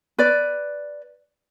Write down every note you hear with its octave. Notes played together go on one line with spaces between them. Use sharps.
B4 D5